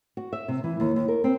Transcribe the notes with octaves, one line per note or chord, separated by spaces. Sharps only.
F#4
E5
C3
E3
D#2
D#2
A#4
C4